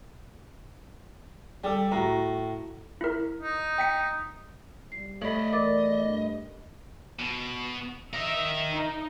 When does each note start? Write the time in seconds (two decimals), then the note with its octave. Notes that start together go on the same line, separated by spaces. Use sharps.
1.64 G3 G4 A4
1.92 A2 F#4 A#5
3.01 E4 A#4
3.42 D#4
3.78 G5 B6 C#7
4.92 G3 C7
5.22 A3 D5 D#5 B5 F#7
5.53 E2 A#4 D5 D#5 D6 A6
6.04 G2
7.19 B2
8.13 A#4 D#5 E5
8.72 D#4